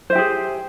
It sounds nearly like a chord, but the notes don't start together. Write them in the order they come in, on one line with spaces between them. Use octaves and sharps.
C5 E5 G4 G#4